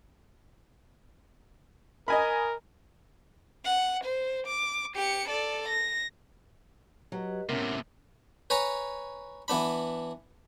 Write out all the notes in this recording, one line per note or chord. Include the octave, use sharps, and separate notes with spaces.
A#4 D#5 G#5 B5
F#5
C5
D6
G4 C#7
A4 D5
A#6
F#3 G4 B4 D#5
A2 C3 B3 C#4 A#4 E5
B4 C#5 G#5 A#5
E3 B3 D4 B5